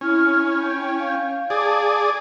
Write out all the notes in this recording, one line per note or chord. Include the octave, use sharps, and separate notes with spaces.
C#4 E4 F6
G5 G6
F5
G#4 D5 A5 D6